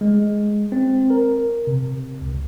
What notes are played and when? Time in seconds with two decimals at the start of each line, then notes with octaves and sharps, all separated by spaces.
0.01 G#3
0.72 C4
1.10 A#4
1.67 C3
2.21 C#2